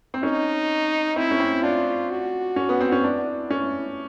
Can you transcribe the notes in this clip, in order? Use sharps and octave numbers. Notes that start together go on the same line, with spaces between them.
C4
C#4 D#4
C4 E4
C#4
C4
D4 F4
F#4
C#4
B3
C4
C#4
D4 E4
C#4